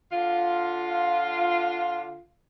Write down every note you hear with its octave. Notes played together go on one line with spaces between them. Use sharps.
D3 F4